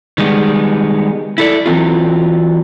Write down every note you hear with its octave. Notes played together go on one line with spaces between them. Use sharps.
D#3 G3 G#3 B3
E4 A4 D5
E3 F#3 C4 F4